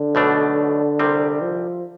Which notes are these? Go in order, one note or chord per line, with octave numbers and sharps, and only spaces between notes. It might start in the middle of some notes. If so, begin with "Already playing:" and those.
Already playing: D3
B1 B2 A3 D4
C2 C3 G3 C4
F3